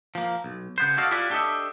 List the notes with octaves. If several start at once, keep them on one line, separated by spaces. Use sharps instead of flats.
F3 A#3
B1
C#3 B3 C5
F#4 A4 D5 D#5 F5
E4 F4 G4 B4 D5 E5
D4 G4 A4 C#5 D#5 E5